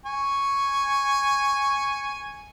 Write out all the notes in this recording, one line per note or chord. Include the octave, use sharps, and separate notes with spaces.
G#5 C#6